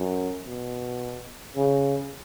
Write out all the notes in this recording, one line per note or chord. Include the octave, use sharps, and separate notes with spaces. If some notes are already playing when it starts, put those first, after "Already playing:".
Already playing: F#2
B2
C#3